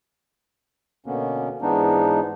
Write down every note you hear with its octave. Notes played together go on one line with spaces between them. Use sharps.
B2 D3 A#3 B3 C#4
G#2 E3 G#3 B3 D4 D#4